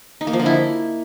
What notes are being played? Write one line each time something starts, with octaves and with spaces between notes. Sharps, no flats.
D#4
A#3
F3
D3
E4